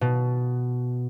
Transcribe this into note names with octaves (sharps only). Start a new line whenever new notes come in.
B2